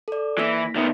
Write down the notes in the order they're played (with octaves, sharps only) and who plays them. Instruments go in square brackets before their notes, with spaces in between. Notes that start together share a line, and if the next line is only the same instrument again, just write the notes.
[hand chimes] A4 D5
[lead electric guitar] E3 [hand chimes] A#3 A#6 B6
[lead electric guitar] D#3 B3 [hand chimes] E5